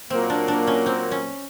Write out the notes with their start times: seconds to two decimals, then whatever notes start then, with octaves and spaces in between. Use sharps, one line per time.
0.10 A#2 F#3 A#3 C4
0.30 D4
0.48 D4
0.67 C#4
0.86 C4
1.11 C#4